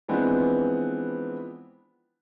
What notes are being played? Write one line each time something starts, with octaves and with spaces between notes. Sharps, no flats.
E3 F3 G#3 B3 C4 D4